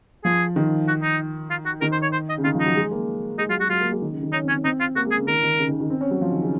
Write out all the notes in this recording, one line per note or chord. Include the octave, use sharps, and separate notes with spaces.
F3 G#4
D#3
F#4
D#4
F4
F#4
D#3 A#4
C5
C#5
C5
D#5
C#3
D#3 F4
F3 D#4
F#3
G#3
A#3
G#3 D#4
F#3 F4
G#3 F#4
F#3 F4
A#3
G#3
D#3
C#3
D#3
C#4 D#4
C4
C#4
C4
C4 D#4
F4
A#3 F#4
G#3 G#4
C#3
D#3 A#4
D#3
C#3
D#3
D#3
C4
C#4
F#3
F3
D#3
C#3